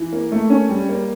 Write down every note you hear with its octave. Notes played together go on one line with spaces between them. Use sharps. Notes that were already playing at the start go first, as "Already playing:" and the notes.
Already playing: E3
A#3
A3
C#4
G3
A#3